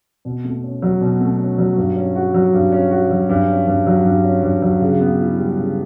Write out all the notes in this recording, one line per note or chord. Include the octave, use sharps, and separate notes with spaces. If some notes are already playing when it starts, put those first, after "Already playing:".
B2
A3
C#4
F#3
B2
A3
C#4
F#3
G2
C#4
F#4
F#3
G2
C#4
F#4
F#3
G2
C#4
G2
F#3
G2
C#4
G2
F#3
C#3
B3
E4
G3
C#3